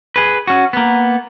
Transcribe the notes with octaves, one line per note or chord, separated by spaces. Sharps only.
G#4 B4
C#4 F#4
A#3 B3